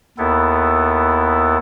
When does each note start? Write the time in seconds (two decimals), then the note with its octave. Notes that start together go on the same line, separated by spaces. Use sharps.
0.18 D#2 B3 E4 A4